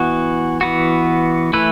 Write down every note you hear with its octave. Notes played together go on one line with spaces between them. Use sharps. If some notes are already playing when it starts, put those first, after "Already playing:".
Already playing: E3 B3 F#4
E3 B3 F#4
E3 A3 E4 B4